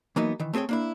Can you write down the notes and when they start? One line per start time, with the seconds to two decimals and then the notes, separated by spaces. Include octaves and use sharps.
0.16 E3 F#3 A#3 B3 D#4
0.40 D#3 E3
0.53 A3 C4 G#4 C#5 G5
0.69 A#3 D4 E4